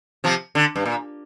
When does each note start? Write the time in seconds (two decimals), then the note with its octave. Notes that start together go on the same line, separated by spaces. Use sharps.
0.24 C3 F3
0.55 D3
0.76 G2
0.85 A#2